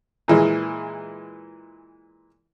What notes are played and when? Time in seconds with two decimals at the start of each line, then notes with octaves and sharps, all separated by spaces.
0.28 A#2 E3 G#3